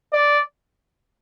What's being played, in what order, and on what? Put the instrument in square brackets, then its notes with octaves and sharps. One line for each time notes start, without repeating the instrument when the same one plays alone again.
[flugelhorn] D5